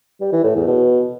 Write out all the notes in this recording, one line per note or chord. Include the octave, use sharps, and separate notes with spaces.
G3
E3
A2
E2
B2